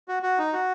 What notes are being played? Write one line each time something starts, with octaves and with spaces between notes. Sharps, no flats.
F#4
F#4
D#4
F#4